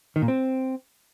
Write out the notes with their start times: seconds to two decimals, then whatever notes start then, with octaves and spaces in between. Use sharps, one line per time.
0.16 D#3
0.22 A#2
0.28 C4